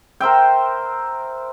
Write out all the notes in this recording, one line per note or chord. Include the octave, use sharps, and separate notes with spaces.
A#4 C5 E5 G5